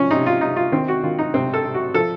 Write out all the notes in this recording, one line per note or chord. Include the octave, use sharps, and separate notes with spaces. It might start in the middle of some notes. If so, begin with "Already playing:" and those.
Already playing: F3 C#4
C3 D#4
F4
C3 D#4
F4
D#3 C4
F#4
D#3 F4
D#4
C3 C4
A4
C3
F#4
F3 A4